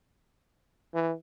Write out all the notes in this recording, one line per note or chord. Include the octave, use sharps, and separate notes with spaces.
E3